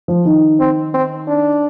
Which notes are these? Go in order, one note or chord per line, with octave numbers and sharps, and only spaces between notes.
F3
D#3
C4
C4
D4